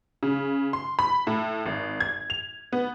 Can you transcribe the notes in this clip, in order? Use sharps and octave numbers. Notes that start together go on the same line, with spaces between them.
C#3
C6
B5
A2
G#1
G#6
F7
B3